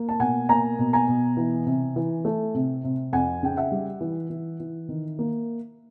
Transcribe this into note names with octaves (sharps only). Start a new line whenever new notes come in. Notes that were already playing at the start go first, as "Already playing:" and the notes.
Already playing: A#3
A5
B2 F#5 G#5
A#3 G#5 A#5
B2
G#5 A#5
B2
E3
C3
E3
A3
C3
C3
F2 F#5 G#5
C#3 G5
E5 F#5
G3
E3
E3
E3
D#3
A#3